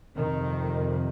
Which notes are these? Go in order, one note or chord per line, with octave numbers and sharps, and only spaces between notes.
F2 C3 D#3